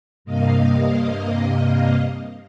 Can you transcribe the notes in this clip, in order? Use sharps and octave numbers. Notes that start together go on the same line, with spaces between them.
G2 C3 A#3 D#5 F5